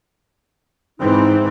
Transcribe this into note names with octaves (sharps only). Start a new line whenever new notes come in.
G#2 E3 C4 D#4